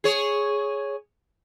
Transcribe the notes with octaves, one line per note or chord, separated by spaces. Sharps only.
G#4 C#5